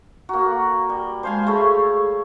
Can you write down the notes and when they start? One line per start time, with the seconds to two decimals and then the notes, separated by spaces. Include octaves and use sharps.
0.29 A#3 F#4 A#5
0.89 G3
1.23 G#3 C5 F5 G#5 A5
1.47 A3 G#4 C#5 B5